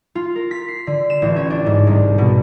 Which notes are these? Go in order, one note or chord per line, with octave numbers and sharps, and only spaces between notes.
F4
A#4
B6
C7
D3
E7
A1
C#4
D4
G#2
C2
B2